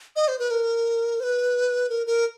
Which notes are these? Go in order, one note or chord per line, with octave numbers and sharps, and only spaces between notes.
D#5
C5
B4
A#4
C5
B4
A#4
A#4